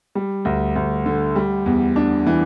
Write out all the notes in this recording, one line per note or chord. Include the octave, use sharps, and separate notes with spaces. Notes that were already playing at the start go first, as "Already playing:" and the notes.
G3
D2
D2
D3
G3
E2
D4
E3